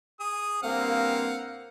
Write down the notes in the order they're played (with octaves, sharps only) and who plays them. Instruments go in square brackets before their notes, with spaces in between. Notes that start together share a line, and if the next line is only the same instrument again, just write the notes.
[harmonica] G#4 D#6
[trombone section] G2 A#3 C4 [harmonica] F5 F#5